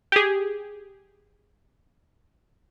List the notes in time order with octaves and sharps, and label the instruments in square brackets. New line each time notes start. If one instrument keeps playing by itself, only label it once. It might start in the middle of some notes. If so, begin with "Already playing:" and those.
[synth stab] G4 G#4